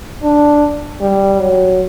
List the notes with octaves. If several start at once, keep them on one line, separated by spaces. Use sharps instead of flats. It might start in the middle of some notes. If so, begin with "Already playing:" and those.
D4
G3
F#3